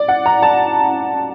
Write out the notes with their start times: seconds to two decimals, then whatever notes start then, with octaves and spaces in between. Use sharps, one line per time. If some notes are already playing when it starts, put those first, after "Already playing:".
Already playing: D5
0.08 F#5
0.26 A#5
0.42 A5